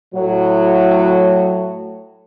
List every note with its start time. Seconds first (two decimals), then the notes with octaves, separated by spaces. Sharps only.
0.15 A2 F#3 F#4